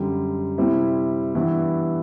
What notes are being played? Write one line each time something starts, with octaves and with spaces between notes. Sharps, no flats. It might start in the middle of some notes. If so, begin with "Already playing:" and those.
Already playing: F#2 D3 G3
C3 G3 C4 E4
G2 E3 B3 E4